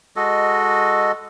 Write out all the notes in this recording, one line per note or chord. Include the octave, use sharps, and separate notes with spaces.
G#3 F#4 A4 D#5